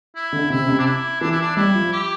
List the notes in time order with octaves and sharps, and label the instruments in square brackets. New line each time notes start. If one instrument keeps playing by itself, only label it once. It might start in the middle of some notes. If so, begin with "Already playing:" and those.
[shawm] E4
[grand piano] D3
[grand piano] C3 [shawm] E4
[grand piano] C3
[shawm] D4
E4
[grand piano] E3 [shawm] D4
[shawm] E4
D4
[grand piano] G3 [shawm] E4
[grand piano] F3
[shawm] G4